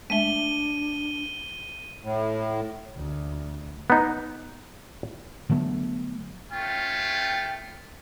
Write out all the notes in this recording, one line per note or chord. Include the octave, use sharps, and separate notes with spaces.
G#3 A3 D4 E5 D#7 G7
A2
D2
B3 D#4
D3 F#3 A3 B3
A3 C#4 F4 G5